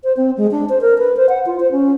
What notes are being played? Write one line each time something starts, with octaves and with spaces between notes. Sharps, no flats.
C5
C4
G#3
D4
C5
A#4
B4
C5
F#5
F4
C5
C#4